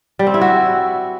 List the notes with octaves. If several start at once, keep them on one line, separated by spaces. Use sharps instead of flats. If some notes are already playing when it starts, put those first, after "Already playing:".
G3
C4
E4
F#4